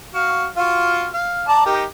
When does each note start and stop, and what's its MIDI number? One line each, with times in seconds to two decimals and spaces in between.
0.14 0.46 66
0.14 0.46 77
0.57 1.07 65
0.57 1.07 66
0.57 1.07 77
1.13 1.43 77
1.48 1.65 74
1.48 1.65 81
1.48 1.65 82
1.66 1.84 63
1.66 1.84 67
1.66 1.84 70